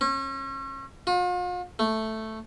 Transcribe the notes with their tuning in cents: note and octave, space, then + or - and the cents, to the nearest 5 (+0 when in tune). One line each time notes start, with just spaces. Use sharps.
C#4 -35
F4 +45
A3 +0